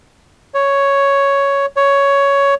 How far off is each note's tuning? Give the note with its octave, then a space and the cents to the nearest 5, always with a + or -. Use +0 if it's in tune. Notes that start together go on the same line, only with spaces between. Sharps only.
C#5 +5
C#5 +10